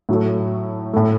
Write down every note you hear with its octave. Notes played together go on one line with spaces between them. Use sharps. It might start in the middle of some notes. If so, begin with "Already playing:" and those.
A2 F#3 A3
A2 A3